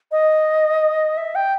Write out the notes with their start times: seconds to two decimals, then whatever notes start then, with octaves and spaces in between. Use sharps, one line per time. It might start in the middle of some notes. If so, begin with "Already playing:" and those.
0.12 D#5
1.17 E5
1.35 G5